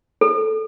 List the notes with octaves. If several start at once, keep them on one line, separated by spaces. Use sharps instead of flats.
A4